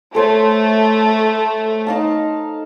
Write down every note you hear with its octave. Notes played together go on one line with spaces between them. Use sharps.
A3 A4 C5 C#5
D#4 F5 A5